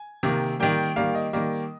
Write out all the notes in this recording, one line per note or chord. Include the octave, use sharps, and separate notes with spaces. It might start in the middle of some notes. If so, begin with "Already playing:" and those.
Already playing: G#5
C3 D#3 A#3
D#3 G3 A#3 G5
D#3 G3 A#3 F5
D#5
D#3 G3 A#3